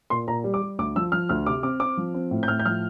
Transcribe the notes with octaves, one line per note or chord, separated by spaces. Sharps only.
A#2 C6
A#2 A#5
G3
D6
G3
D2 D6
F3 E6
F3 F6
D2 F6
C3 D6
C4 D6
C4 D6
F3
C4
A2
G6
A2 F6
G6
F3 F6